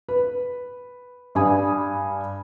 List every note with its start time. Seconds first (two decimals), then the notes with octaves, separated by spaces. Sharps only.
0.09 B4
1.35 G2 G3 G#5 D#6